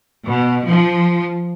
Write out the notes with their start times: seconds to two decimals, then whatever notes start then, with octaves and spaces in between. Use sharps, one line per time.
0.24 B2
0.65 F3